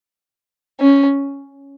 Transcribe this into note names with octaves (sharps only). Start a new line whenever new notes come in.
C#4